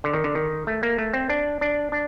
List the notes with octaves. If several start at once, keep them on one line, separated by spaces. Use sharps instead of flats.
D3
D#3
D3
D#3
A3
A#3
A3
C4
D4
D4
D4